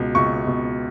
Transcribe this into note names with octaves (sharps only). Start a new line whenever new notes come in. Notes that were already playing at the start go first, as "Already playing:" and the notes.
Already playing: C#2 B2
C#2 C#6
B2